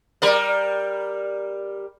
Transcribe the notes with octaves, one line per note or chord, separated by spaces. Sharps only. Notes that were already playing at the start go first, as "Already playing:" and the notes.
G3 A#4 D5